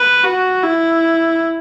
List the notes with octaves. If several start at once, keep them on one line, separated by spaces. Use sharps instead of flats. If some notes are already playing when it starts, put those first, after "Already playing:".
Already playing: B4
F#4
E4